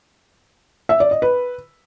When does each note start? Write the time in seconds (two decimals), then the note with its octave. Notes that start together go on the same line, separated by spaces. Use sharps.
0.89 E5
1.00 D5
1.11 D#5
1.22 B4